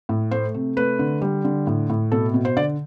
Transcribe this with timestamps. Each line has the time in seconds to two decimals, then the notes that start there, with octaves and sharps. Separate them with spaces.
0.09 A2
0.31 A3 C5
0.54 C3
0.77 A3 B4
0.99 D3
1.22 G3
1.44 D3
1.67 A2
1.90 A2
2.12 B2 A4
2.34 B2
2.45 C5
2.56 D3 D5